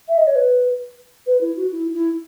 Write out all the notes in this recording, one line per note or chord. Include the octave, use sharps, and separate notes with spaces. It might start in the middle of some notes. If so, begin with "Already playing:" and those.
E5
D#5
C#5
B4
B4
E4
F#4
E4
E4